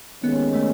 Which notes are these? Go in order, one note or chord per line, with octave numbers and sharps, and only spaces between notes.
D#2 D#3 G#3 B3 C#4
A3